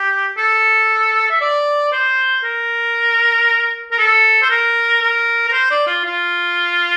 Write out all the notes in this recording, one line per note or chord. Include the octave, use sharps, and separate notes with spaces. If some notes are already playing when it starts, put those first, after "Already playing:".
Already playing: G4
A4
E5
D5
C5
A#4
A#4
A4
C5
A#4
A#4
A#4
C5
D5
F4
F4